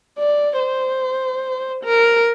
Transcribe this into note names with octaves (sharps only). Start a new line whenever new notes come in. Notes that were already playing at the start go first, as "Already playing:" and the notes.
D5
C5
A#4